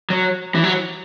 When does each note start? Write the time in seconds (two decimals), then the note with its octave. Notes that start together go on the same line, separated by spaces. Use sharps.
0.10 F#3
0.55 E3
0.64 F#3